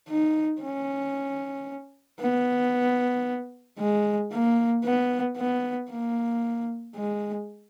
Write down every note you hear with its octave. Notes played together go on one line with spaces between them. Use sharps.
D#4
C#4
B3
G#3
A#3
B3
B3
A#3
G#3